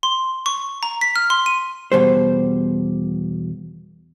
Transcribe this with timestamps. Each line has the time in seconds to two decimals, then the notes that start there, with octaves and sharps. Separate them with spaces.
0.03 C6
0.46 C#6
0.83 A#5
1.01 B6
1.16 F6
1.30 C6
1.46 D#7
1.92 E2 B2 G3 C5